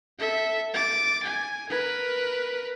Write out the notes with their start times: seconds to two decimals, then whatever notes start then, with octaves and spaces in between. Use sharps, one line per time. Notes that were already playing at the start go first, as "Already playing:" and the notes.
0.19 A4 E5
0.74 D6 A6
1.23 G#5
1.69 A#4 B4